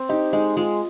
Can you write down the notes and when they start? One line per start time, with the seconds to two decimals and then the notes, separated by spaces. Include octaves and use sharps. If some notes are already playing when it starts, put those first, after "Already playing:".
Already playing: C4
0.09 D#4 G4
0.33 G#3 D#4
0.57 G#3 F4